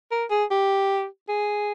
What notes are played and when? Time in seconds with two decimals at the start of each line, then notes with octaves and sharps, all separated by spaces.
0.11 A#4
0.30 G#4
0.51 G4
1.29 G#4